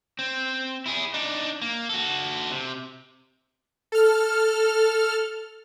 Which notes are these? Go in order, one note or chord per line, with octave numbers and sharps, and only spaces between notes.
C4
E4 G#4
D4 D#4
A#3
F#4 A4
C3
A4 F6